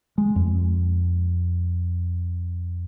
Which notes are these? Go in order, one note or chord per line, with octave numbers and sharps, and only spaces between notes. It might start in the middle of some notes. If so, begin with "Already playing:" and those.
G#3
F2